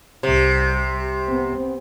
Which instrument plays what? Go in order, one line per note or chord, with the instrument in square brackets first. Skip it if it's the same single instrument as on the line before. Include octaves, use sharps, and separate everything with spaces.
[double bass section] C2 G3 [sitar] C3
[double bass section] B3 C4